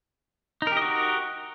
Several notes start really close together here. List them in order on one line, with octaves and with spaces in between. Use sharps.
D#4 A#4 G4 D#5 F#4